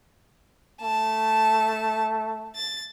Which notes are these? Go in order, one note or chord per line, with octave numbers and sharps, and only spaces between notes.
A3 A5
A6